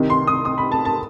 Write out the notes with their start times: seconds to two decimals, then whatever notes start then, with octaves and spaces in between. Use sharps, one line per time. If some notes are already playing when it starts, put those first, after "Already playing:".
Already playing: C2 C3 D#3
0.10 C6
0.27 D#6
0.45 D#6
0.58 B5
0.72 A5
0.85 A5